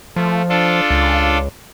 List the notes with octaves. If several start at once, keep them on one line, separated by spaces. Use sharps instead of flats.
F3 A3
D4 F4 A4
C#2